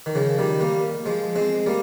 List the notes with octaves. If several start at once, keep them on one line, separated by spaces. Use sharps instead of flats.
D#3
C#3 F3
D#3 G3
G3 A#3
F3 G#3
G#3 C4
G3 A#3